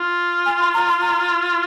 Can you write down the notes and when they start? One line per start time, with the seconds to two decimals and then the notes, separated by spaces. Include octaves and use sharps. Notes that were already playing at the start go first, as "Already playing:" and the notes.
Already playing: F4
0.46 G#5
0.60 C6
0.74 A#5
0.88 C6
1.02 A#5